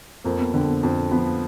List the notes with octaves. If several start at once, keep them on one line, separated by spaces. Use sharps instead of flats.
F2 A#3
B3
D3 C4
B3
F2
F3 B3